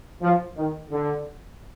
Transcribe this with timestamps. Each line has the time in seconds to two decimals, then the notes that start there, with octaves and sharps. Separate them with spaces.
0.22 F3
0.56 D#3
0.90 D3